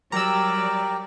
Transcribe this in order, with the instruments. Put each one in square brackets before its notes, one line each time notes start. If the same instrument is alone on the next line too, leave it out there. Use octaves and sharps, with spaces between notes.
[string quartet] F#3 G3 D5 [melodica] G4 A#4 [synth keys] A#5 E6